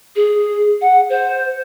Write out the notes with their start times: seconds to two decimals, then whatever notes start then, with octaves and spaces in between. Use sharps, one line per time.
0.16 G#4
0.81 F#5
1.10 C5